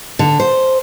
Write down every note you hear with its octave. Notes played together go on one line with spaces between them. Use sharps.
D3
C5